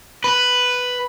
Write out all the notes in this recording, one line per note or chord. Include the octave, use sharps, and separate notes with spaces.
B4